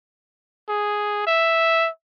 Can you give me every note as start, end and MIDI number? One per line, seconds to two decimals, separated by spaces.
0.69 1.25 68
1.27 1.88 76